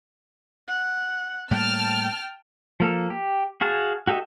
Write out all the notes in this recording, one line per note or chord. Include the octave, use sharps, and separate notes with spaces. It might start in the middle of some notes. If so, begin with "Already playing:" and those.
F#5
A2 G3 A#3 G5 A5 F6
F3 A#3 A4
G4
F#4 G#4 F5 A5
F#4 G4 A4 D#5 E5